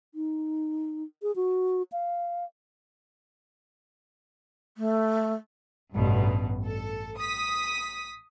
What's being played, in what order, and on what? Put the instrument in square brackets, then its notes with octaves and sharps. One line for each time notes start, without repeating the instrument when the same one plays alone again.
[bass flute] D#4
G#4
F#4
F5
[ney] A3
[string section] A1 G2 B2
A4
D#6 B6